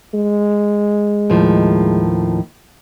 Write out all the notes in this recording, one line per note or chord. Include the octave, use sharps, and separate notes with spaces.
G#3
D#2 A2 F3